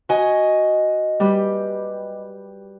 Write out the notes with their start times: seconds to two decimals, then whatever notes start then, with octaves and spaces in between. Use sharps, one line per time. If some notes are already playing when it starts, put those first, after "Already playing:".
0.09 F#4 D#5 G#5
1.20 G3 G4 B4